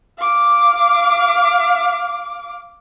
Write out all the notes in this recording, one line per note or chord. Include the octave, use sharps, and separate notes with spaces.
F5 D6